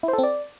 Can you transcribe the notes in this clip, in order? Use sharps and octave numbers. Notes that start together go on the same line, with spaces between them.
E4
C5
A4
C4
D5